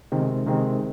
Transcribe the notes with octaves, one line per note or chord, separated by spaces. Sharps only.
C3 D#3 G#3 C4
C3 D#3 G#3 C4